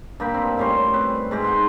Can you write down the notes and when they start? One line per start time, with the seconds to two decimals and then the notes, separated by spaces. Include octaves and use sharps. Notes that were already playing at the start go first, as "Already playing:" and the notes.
0.20 G2 A#3 G5 B5
0.34 C4
0.58 A2 G3 C#4 C6
0.94 C4 B4
1.31 G#2 G#3 G4
1.44 D#4 F#5 C6